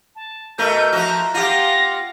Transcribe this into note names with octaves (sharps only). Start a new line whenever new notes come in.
A5
B2 A3 A#4 G6
F3 F#4 E5 A#5
F4 G4 F5 F#5 A#6